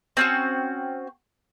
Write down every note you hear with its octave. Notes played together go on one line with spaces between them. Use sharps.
C4 C#4 F#4